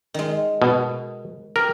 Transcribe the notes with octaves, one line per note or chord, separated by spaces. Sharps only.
D#3 G#3
B2
G4 A#4